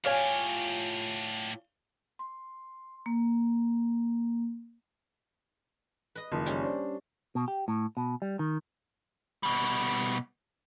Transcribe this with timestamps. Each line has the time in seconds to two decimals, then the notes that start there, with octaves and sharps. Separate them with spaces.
0.04 A2 F4 G4 C#5 G#5
2.19 C6
3.06 A#3
6.15 B4 D#5
6.32 F#1 D#3 F3
6.46 G3 C#4
6.63 D4 C5
7.35 B2
7.48 G4
7.68 A2
7.97 B2
8.22 G3
8.39 D#3
9.43 B2 G3